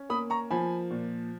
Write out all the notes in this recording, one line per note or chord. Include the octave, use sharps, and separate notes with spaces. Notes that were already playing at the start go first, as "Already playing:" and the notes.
Already playing: C#4
A#3 B5 D#6
A#5 C#6
F3 G#5 B5
A#2